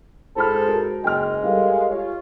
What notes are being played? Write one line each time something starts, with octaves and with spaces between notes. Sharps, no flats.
G#2 F4 G#4 A4 C5 B5 F6
F#4 A#4
F#1 G#3 G5 F6
G3 A4 A#4 F5
F4 C#5